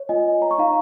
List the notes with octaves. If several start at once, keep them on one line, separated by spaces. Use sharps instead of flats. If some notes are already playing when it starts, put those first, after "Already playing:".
Already playing: C#5
F4 D#5 G#5
C#5
C#5 A#5
C#6
D#4 F5 A#5